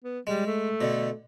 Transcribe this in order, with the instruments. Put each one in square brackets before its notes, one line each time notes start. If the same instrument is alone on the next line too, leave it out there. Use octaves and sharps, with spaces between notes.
[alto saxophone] B3
[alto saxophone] G3 [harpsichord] G#3
[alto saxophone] A3
[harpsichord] B2 D3